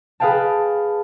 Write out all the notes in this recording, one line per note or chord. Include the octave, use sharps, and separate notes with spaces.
G#4 B4 F5 G5 A5